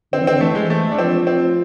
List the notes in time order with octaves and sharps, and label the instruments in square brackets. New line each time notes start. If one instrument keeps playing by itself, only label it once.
[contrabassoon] D3 [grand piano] C4
[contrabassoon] E3
[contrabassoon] D3 [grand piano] C4
[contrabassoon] E3 [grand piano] A3
[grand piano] G#3
A3
D4
[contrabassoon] F3 [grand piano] C4
[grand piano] C4